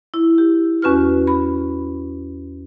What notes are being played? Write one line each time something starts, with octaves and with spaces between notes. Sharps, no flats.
E4
G4
E2 C#4 F#4 B4 F6
B5